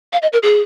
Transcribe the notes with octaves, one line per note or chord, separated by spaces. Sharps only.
F5
D#5
A#4
G#4